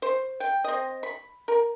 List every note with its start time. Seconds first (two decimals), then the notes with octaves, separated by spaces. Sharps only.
0.02 C5
0.40 G5
0.64 C4 D#5
1.03 B5
1.48 A#4